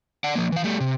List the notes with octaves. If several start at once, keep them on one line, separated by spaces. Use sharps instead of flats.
D5 F#5
F3 A#3
E3 F5
G3 A3
C3